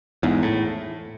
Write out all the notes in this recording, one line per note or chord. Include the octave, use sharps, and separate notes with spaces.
E2 G#2
A2